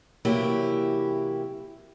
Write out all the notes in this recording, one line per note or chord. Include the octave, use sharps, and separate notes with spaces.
C3 E3 F#3 A#3 E4 G4